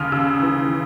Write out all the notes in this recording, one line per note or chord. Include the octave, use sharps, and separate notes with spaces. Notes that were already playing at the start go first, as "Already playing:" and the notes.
Already playing: D#2 C#3 D#6 F6
C#3 E6
E3